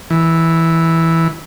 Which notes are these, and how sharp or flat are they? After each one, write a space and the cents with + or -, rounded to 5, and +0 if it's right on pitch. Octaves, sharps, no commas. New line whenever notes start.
E3 -5